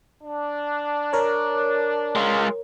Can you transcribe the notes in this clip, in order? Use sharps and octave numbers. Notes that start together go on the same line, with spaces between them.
D4
A#4 C#5
G#3 F4